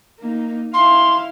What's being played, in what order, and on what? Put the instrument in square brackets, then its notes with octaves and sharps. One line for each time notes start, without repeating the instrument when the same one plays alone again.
[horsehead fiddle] A#3 D#4
[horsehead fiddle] E4 F5 [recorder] C6